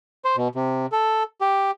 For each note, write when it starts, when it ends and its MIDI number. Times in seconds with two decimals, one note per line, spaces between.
0.25 0.36 72
0.37 0.48 47
0.55 0.86 48
0.92 1.23 69
1.41 1.71 67